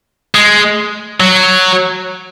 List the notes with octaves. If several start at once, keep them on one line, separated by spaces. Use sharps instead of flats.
G#3
F#3